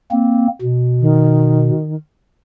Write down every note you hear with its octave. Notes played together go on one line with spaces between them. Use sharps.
A#3 C4
B2
D#3